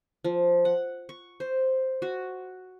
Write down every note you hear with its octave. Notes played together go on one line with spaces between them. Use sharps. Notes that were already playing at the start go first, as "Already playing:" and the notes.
F3
F#5
C#6
C5
F#4